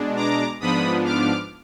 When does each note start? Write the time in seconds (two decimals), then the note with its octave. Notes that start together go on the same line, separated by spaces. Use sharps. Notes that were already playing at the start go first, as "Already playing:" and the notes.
Already playing: B2 G#3 D4
0.16 A#5 D6
0.60 G#2 F3 B3 D4 B5 D#6
1.05 D6 F6